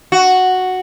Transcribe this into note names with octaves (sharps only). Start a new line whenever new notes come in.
F#4